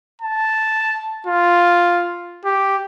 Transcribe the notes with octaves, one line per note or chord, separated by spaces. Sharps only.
A5
F4
G4